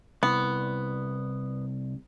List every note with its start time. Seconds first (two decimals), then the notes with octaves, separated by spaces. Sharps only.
0.23 C2 B3